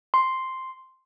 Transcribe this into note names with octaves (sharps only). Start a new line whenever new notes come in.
C6